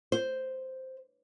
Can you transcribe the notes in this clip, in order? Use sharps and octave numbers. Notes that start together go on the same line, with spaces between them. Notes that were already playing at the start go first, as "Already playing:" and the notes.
C5